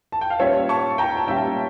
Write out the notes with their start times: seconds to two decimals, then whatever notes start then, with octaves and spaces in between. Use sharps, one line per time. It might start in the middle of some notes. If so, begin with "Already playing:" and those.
0.12 A5
0.21 G5
0.30 F5
0.39 A#2 G3 C#4 F4 C#5 E5
0.69 A5 C#6
0.98 G5 A#5
1.17 A5
1.28 A#2 G3 C#4 F4 E5 G5